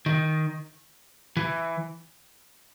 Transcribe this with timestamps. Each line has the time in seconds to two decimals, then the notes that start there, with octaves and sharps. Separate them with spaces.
0.06 D#3
1.37 E3